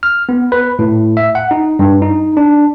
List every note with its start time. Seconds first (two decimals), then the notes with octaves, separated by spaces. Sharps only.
0.03 F6
0.29 B3
0.52 B4
0.79 A2
1.17 E5
1.35 F#5
1.51 D#4
1.79 G2
2.02 D#4
2.37 D4